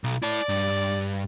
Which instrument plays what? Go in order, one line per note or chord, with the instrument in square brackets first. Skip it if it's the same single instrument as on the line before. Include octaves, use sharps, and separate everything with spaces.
[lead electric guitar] B1
[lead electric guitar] E4 A5 [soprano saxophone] D5
[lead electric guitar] G2